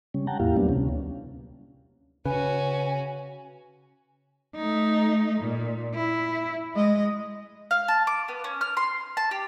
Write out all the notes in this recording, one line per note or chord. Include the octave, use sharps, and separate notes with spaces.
C#3 G3 C#4
F#5 G5 A5 A#5
E2 A2 A#3 E4 G4 F5
F#3 G3 A#3 B3 D4
D2 C3 C#4
C#3 C#4 F#4 B4 G#5
A3 D#4
A#2
E4
G#3 D#5
F5
A5
D6
B3
C#4
F6
C6
A5
G4